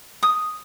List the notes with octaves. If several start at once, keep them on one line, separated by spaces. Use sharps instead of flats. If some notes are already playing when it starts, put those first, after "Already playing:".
D#6